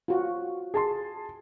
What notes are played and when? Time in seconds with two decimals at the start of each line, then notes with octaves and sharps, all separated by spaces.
0.08 F4 F#4
0.74 G#4 A5 C6